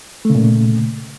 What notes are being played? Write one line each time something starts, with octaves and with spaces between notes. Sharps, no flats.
A#2 C#3 A3